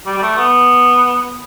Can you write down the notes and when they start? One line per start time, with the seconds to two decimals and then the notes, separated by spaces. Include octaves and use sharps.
0.06 G3
0.17 G3
0.22 A3
0.37 B3